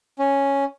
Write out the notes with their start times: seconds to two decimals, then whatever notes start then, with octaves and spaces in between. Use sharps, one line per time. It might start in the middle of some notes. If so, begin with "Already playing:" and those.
0.19 C#4